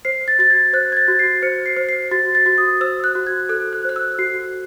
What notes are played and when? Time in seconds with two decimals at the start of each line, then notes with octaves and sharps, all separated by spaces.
0.05 C5 C7
0.28 A6
0.39 F#4 A6
0.50 G#6
0.73 C5 F#6
0.92 G#6
0.97 A6
1.08 F#4
1.19 C7
1.42 C5 C#7
1.66 C7
1.77 C5
1.89 C7
2.11 F#4 A6
2.35 A6
2.46 F#4
2.58 D#6
2.81 C5 E6
3.04 F#6
3.15 F#4
3.27 G#6
3.49 A4 F#6
3.73 F#6
3.85 C5 F#6
3.96 E6
4.19 F#4 C7